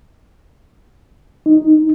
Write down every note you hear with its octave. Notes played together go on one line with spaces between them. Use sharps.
D#4